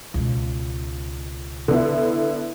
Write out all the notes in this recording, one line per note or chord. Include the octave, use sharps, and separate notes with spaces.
C#2 B2
D3 B3 E4